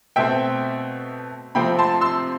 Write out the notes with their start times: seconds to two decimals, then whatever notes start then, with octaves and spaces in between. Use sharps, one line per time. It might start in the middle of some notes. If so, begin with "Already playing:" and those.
0.16 B2 A3 C4 E5 G5
1.55 C3 F3 A3 C4 G5 B5
1.79 A5 C6
2.01 C6 E6